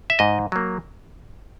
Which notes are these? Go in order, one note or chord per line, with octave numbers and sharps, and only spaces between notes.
E5
G#2 D#5
F#3 A#3